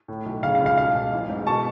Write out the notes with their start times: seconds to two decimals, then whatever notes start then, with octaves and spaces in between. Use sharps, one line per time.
0.08 A2
0.25 B1
0.43 C#3 F5
0.55 F5
0.60 C#2
0.66 F5
0.78 B1 F5
0.95 B1
1.12 A1
1.30 G#2
1.47 B2 A5 C#6